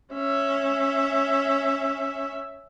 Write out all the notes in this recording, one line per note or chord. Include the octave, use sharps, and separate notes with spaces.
C#4 E5